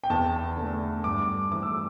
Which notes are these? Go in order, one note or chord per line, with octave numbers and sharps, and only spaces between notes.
G5
E2 A5
D3
A3
G2 D6
E3 A3 D6
E6